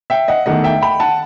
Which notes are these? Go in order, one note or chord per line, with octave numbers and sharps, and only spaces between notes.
E5 G5
D#5 F#5
E2 D#3 A3 D#5 F#5
E5 G5
G5 B5
F#5 A5